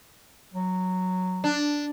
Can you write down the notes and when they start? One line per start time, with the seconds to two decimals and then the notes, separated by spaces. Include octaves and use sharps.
0.54 F#3
1.44 D4